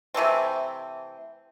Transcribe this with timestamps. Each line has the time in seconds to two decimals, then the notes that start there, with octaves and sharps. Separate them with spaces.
0.14 C3 E3 A3 C4